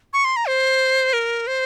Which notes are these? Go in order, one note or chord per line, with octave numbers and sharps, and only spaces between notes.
C#6
C6
A#5
C5
A#4
C5